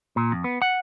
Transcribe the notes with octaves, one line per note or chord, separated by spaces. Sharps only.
A#2
F2
B3
F#5